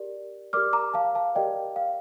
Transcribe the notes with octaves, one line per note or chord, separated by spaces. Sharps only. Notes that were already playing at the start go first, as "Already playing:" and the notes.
Already playing: G4 A#4 D5
G4 A#4 D5 D6 F6
A#5 D6
F5 A5
F5 A5
G4 A#4 D5 D#5 G5
F5